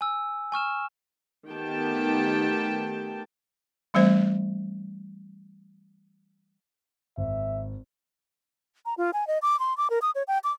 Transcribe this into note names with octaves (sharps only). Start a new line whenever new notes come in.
G#5 E6
G#5 C#6 F6 E7
D#3 A3 B3 G4 G5 A5
E3 G3 A3 C4 C5
G#1 E5
A#5
F4
G#5
D#5
D6
C6
D6
A#4
D#6
C#5
G5
D6